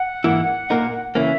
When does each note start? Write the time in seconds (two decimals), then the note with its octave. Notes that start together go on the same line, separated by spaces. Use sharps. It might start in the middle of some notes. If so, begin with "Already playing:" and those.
Already playing: F#5
0.24 G#2 E3 A#3 E4
0.70 A#2 A#3 D#4 A#4
1.15 C#3 E3 A#3 C#4 E5